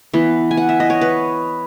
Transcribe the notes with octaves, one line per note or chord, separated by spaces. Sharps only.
E3 B3
G#5
F#5
E5
D#5
C#5
B4